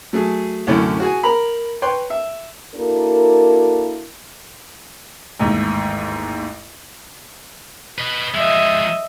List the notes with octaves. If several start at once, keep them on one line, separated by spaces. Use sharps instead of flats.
F#3 A3 G#4
C2 F#2 D3 A3 C#4 E4
F#4 G#4 G#5
A#4 A#5 B5
B4 C#5 G5 C6
E5
A#3 D4 E4 F#4 A4 A#4
A1 D#2 G#2
B4 D#5
F3 G#3 D#5 E5